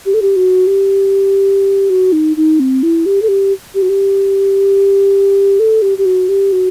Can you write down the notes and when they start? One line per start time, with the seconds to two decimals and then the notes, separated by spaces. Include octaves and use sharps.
0.06 G4
0.14 A4
0.22 G4
0.36 F#4
0.67 G4
1.90 F#4
2.12 D#4
2.37 D#4
2.60 C4
2.83 E4
3.06 G4
3.22 A4
3.28 G4
3.75 G4
3.82 F#4
3.89 G4
5.60 A4
5.82 G4
5.98 G4
6.06 F#4
6.29 G4
6.52 F#4